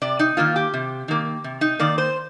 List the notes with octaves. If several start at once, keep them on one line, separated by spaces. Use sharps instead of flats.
C3 D5
D#4
D#3 A#3 F4
G4
C3
D#3 A#3
C3
D#4
D#3 A#3 D5
C5